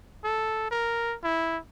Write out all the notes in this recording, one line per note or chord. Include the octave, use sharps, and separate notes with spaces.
A4
A#4
E4